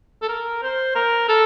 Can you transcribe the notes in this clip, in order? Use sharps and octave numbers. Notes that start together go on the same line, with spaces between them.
A4
A#4
C5
A#4
A4